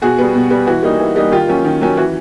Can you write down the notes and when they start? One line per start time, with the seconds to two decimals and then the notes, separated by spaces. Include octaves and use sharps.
0.01 B2 F#4 G#4
0.18 G3 B3
0.34 B2
0.50 G3 B3
0.67 E3 F#4
0.83 G3 A#3 D#4
0.99 E3
1.16 G3 A#3 D#4
1.31 D#3 F4 G4
1.48 F#3 A#3 C#4
1.65 D#3
1.81 F#3 A#3 C#4
1.97 E3 F#4